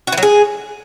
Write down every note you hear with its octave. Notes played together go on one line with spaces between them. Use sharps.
F#4
E3
F#3
G#4